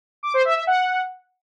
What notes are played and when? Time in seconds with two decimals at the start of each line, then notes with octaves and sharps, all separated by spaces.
0.23 D6
0.34 C5
0.45 E5
0.56 E5
0.67 F#5